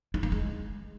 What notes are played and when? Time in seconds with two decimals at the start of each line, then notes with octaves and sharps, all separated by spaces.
0.14 E4
0.23 A#3
0.32 G#3